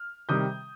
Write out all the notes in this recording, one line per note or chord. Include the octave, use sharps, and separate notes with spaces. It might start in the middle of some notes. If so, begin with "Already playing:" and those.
Already playing: F6
C3 D#3 G3 D#6 G6